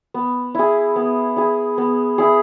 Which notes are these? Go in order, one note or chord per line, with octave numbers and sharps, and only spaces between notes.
B3
E4 G#4
B3
E4 G#4
B3
E4 G#4